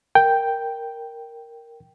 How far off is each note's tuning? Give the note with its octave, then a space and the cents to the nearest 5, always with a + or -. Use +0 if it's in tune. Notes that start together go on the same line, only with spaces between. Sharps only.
A#4 +0 G5 +0